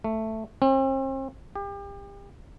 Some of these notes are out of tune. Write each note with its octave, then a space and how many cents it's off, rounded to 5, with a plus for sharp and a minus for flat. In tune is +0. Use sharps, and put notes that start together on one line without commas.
A3 +5
C4 +40
G4 +35